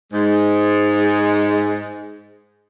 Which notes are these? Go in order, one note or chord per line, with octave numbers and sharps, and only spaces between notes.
G#2 G#3